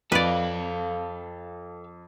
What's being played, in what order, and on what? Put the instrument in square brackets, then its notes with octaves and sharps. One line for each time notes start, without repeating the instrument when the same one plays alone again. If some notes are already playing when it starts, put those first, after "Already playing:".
[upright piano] F2 [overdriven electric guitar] A4 F5 [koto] B4 D5